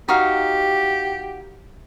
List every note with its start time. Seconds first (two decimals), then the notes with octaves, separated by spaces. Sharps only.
0.09 D#4 F#4 G4 F5